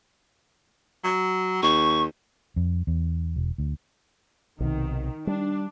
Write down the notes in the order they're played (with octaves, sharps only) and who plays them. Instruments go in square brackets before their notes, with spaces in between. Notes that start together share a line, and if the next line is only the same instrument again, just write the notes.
[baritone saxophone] F#3
[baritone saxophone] D#2 [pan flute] C#6
[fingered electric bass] F2
E2
E1
D2
[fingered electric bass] B1 C3 [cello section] D#3
[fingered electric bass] G3 [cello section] D4